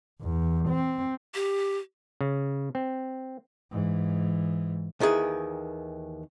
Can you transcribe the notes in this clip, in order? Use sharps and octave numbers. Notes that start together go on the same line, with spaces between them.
E2
C4
G4
C#3
C4
G#2 E3
D#2 D#3 E3 G#4